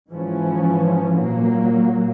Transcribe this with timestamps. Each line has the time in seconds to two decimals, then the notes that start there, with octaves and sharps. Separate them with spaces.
0.10 G#2 E3 F3 C#4
1.17 A#2 F#3 A#3